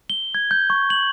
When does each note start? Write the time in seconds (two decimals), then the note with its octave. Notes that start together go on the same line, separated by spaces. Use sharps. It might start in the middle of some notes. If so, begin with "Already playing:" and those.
0.10 G7
0.35 G#6
0.51 G6
0.70 C#6
0.90 F#7